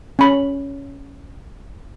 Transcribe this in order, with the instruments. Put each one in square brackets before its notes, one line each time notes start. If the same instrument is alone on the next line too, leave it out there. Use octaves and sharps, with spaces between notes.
[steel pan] C#4 B5